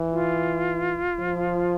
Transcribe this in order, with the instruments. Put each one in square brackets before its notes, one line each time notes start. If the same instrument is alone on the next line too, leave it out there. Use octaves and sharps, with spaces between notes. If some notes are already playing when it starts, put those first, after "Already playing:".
Already playing: [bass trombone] E3
[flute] F4
[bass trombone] F3